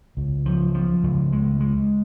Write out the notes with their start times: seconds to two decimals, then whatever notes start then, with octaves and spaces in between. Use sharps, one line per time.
0.17 C#2
0.46 F3
0.74 F3
1.04 C#2
1.32 G#3
1.60 G#3